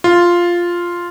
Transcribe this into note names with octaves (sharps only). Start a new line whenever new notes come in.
F4